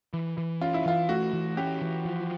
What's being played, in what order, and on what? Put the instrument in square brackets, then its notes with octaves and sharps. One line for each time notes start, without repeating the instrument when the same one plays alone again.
[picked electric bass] E3
E3
[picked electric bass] C#4 [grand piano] F4
[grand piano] E4
[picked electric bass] E3 [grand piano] F4
[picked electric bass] A3 [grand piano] F#4
[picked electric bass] E3
[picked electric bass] C#4 [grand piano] G4
[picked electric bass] E3
F3